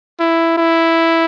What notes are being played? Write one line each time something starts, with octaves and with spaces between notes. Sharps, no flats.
E4
E4